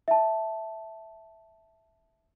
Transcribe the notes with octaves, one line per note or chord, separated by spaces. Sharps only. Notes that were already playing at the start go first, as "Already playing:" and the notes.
E5 A5